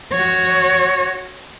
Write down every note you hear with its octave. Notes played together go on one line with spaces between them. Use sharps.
F#4 C#5